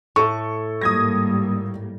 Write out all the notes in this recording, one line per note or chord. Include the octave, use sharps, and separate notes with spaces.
A2 A4 C#6
G#2 G3 A#3 D#6 G#6 A#6